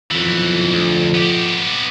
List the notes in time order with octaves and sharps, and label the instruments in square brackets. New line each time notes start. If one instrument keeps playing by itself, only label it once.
[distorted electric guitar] B1 E3 [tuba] F2
[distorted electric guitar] D2
B3 G4